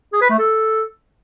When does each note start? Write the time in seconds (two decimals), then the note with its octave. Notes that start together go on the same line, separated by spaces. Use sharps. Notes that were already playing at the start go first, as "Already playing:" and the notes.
0.13 G#4
0.21 B4
0.30 A3
0.39 A4